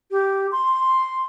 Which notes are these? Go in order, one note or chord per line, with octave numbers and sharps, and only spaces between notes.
G4
C6